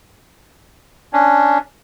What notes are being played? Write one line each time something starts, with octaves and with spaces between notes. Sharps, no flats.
C#4 D4